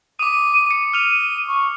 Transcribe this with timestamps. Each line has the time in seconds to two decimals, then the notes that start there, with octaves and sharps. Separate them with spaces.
0.19 D6 D#6 D#7
0.71 C#7
0.93 F6 D#7 F7
1.48 C#6